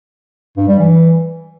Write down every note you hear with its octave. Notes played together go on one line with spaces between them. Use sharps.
G2
G3
E3